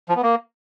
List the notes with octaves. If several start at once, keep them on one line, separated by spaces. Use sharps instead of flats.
F3
B3
A#3